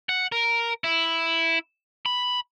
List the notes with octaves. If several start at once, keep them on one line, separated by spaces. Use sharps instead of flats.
F#5
A#4
E4
B5